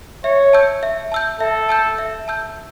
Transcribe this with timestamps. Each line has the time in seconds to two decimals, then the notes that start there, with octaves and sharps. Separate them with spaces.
0.24 C#5 E5
0.53 A5 E6 G6
0.83 E5
1.12 A5 E6 G6
1.40 A4 E5
1.69 A5 E6 G6
1.98 E5
2.28 A5 E6 G6